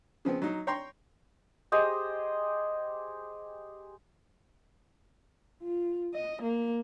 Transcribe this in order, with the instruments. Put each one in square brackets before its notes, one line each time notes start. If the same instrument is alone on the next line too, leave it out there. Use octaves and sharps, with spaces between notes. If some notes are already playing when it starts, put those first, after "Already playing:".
[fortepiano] C#3 F3 B3 C4
F#3 D#4
C#5 G5 A#5 C6
[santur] G4 G#4 C5 D#5
[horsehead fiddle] F4
D#5
A#3